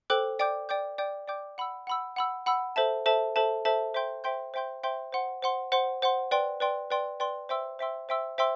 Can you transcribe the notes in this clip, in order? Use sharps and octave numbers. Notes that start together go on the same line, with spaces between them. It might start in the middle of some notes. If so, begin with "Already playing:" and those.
A4 C5 G5 D6 F#6
D5 G5 D6 G6
D5 G5 D6 G6
D5 G5 D6 G6
D5 G5 D6 G6
F#5 B5 E6
F#5 B5 E6
F#5 B5 E6
F#5 B5 E6
A4 C5 E5 A5
A4 C5 E5 A5
A4 C5 E5 A5
A4 C5 E5 A5
C5 E5 G5 C6 G6
C5 E5 G5 C6 G6
C5 E5 G5 C6 G6
C5 E5 G5 C6 G6
C5 F#5 C6
C5 F#5 C6
C5 F#5 C6
C5 F#5 C6
B4 D5 G5 C6
B4 D5 G5 C6
B4 D5 G5 C6
B4 D5 G5 C6
C5 E5 G5 C6 E6
C5 E5 G5 C6 E6
C5 E5 G5 C6 E6
C5 E5 G5 C6 E6